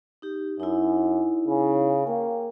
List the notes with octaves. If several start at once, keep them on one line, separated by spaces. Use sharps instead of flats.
D#4 G4
F#2 D#4 E4
C#3
A#3 G5